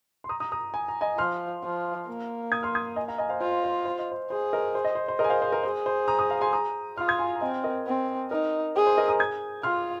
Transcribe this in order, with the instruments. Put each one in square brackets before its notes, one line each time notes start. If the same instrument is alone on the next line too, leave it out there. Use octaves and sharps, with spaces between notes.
[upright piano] C6
A#5 D#6
A#5 D#6
A#5 D#6
G#5
A#5
D#5 G#5
[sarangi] F3 [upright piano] C6 F6
[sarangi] F3
A#3
[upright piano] D#6 G#6
C6 F6
D#6 G#6
D#5 G#5
F5 A#5
D#5 G#5
C5 F5
[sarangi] F4 [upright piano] C5 F5
[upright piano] C5
C5
D#5
C5
[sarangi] G#4 [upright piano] C5
[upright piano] A#4 D#5
C5
D#5
C5
C5
[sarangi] G#4 [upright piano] A#4 D#5
[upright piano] G#5
C5 F5
C5
A#4
[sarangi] G#4 [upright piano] C5
[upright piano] C5
A#5 D#6
A#5 D#6
F5 A#5
G#5 C6
A#5 D#6
[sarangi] F4 [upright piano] C6 F6
[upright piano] D#6 G#6
G#5 C6
A#5
[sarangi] C4 [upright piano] D#5 G#5
[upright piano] A#4 D#5
[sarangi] C4
[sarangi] D#4 [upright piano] A#4
[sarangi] G#4 [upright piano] C5
[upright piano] C5
A#4 D#5
A#5 D#6
D#6 G#6
[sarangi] F4 [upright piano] C6 F6